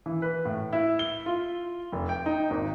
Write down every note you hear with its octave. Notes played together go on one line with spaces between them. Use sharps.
E3
B4
A2
E4
G7
F4
F1
G5
D#4
G#1